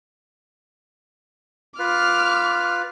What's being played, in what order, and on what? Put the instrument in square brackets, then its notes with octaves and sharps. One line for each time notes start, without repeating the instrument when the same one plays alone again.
[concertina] F4 B4 [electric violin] D6 F6